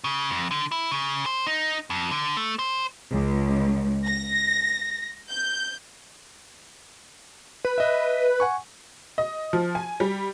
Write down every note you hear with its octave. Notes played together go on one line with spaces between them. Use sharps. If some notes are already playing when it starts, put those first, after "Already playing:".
C#3
F2
D3
E4
C#3
C5
D#4
F2
D3
A3
C5
C#2
A#6
G6
B4
D#5 E5
F#5 G#5 C#6
D#5
F3
G#5
G3